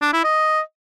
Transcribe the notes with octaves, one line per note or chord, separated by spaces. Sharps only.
D4
E4
D#5